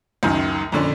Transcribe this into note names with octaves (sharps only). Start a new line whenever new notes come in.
C#2 F#2 D#3
F2 A#2 D3 C#4 D4